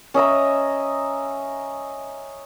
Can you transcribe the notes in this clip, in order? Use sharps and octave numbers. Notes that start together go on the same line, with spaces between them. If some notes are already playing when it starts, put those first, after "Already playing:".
C#4 D#5 E5 A#5